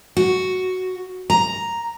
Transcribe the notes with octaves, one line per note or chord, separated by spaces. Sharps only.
F#4
A#5